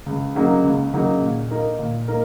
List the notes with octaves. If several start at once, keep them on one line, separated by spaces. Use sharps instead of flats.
C#2
C#3 F#3 A#3 D#4
C#2
C#3 F#3 A#3 D#4
A#2
A#3 D#4 A#4
A#2
A#3 D#4 A#4